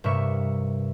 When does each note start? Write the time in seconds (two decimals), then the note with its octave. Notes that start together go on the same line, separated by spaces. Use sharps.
0.04 G2 C3 A#4 E5 C#6